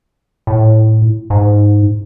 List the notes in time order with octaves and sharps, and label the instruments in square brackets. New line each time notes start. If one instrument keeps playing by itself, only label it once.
[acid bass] A2
G#2